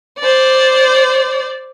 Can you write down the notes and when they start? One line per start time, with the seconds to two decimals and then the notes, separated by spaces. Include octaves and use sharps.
0.19 C5 D5